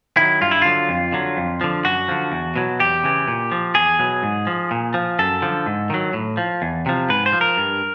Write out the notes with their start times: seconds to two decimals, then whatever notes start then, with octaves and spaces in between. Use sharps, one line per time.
0.17 D#3 F#3 E4
0.41 G2 F4
0.51 E4
0.62 D3 F#3 F4
0.89 F2
1.13 D3 F#3
1.37 F2
1.61 D3 F3
1.85 F#2 F#4
2.08 D3 F3
2.32 E2
2.56 B2 F#3
2.80 E2 G4
3.04 C#3 E3
3.28 A#2
3.52 F3
3.75 E2 G#4
3.99 B2 F#3
4.23 G#2
4.47 F3
4.71 A#2
4.94 F3
5.19 F#2 A4
5.42 D3 F3
5.66 G#2
5.90 D#3 F#3
6.13 A2
6.37 F3
6.62 E2
6.86 C3 F3
7.09 G#2 B4
7.26 C5
7.33 F3
7.41 A#4
7.57 G2